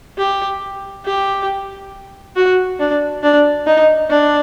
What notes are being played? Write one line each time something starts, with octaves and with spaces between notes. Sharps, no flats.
G4
G4
F#4
D4
D4
D#4
D4